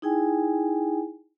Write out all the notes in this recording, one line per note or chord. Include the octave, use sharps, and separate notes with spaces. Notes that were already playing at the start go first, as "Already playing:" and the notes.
D#4 E4 G#4 G5 G#5